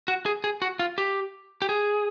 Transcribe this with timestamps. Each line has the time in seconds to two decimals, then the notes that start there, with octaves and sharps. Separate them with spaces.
0.08 F#4
0.26 G#4
0.44 G#4
0.62 F#4
0.79 F4
0.98 G4
1.62 G4
1.69 G#4